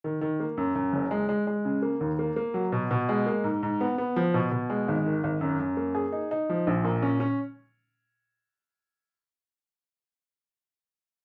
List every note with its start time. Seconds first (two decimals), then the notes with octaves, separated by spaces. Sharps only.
0.04 D#3
0.21 D#3
0.40 A#3
0.57 F#2
0.75 F#2
0.93 F#1
1.11 G#3
1.29 G#3
1.47 G#3
1.65 C#3
1.82 A#3
2.01 D#2
2.19 A#3
2.36 A#3
2.54 F#3
2.72 B2
2.91 B2
3.09 G#3
3.27 A#3
3.44 G#2
3.63 G#2
3.81 B3
3.98 B3
4.16 F3
4.34 B2
4.51 B2
4.70 G#3
4.88 G#1
5.06 D#3
5.24 G#1
5.41 F#2
5.59 F#2
5.77 A#3
5.95 G#4
6.12 D#4
6.31 D#4
6.50 F3
6.67 A#1
6.84 A#2
7.02 C#4
7.20 C#4